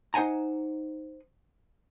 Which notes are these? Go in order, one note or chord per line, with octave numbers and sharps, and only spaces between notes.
D#4 C5 F#5 G#5 A#5